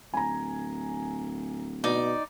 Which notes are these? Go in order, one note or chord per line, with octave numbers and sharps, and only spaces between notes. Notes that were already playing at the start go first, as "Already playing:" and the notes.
D1 G#5 A#5
B2 D#4 D5